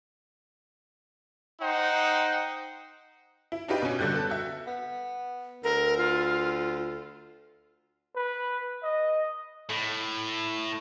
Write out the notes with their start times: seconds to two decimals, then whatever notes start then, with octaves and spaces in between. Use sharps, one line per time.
1.61 D#4 C5 F#5 G5
3.52 E4
3.68 D4 D#4 F4 G4 B4 D5
3.82 B2 C#4
3.99 A#1 D3 G3 F#4 F#6 G6
4.14 B3 A4
4.30 F#4 E5
4.67 B3
5.63 D2 A#4
5.98 F4
8.15 B4
8.83 D#5
9.69 A2